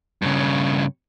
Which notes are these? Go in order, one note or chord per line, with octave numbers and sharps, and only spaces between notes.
G2 C#3